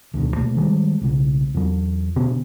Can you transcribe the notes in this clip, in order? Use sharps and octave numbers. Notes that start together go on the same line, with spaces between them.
D1 D2 B2 D#3
C2 B2 A3 A#3
D#3 G3 G#3
B1 C#3
E2 F#3
B2 D3 B3 C#4